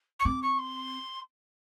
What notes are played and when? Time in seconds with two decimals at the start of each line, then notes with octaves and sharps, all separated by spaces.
0.19 C#6
0.25 C4 D6
0.42 C#6
0.58 C6